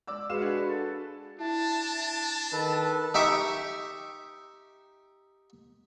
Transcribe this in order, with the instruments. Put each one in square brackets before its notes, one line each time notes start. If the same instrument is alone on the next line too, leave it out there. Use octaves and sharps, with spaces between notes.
[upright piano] D5 D6 E6
[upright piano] G#3 F5 E7 [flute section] F#4 B4
[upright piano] D4 G#4
[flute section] A4
[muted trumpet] D4 [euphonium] E4 [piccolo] A5
[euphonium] D#3 [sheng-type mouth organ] A4 B4
[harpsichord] D#4 G4 E5 C#6